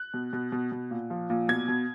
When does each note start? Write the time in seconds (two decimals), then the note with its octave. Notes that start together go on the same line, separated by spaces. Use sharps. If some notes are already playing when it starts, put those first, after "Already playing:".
Already playing: F#6
0.14 B2
0.33 B2
0.52 B2
0.72 B2
0.91 A#2
1.10 F3
1.30 A#2
1.48 B2 G#6
1.68 B2